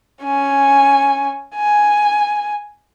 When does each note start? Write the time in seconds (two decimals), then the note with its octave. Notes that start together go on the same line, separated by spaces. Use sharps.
0.24 C#4 G#5
1.55 G#5